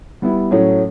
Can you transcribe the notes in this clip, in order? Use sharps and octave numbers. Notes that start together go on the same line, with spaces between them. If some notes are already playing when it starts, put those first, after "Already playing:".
G3 B3 E4
A2 F#3 A3 C#4